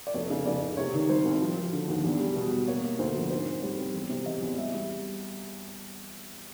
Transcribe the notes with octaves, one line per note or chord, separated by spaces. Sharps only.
D5
F1 C#5
C#3
F1 D5
C#3
C3 C#5
D#3
G3 C5
C2
F3
F3
D3
D#2
E2
G3
B2
B2
A#3 C#5
A#3
D2 C5
F3
G#2 C5
C4
G3 C#5
C4
E2
C3
E2 D#5
E2
G3 E5
G3